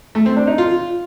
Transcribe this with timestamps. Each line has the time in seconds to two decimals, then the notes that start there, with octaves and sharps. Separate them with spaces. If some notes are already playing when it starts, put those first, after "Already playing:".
0.15 A3
0.26 C4
0.37 D4
0.47 D#4
0.58 F4